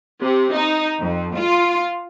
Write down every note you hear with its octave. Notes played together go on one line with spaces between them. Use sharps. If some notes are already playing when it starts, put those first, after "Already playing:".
C3
D#4
F2
F4